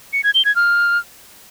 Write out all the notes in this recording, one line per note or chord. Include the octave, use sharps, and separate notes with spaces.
C#7
G#6
G7
G#6
F6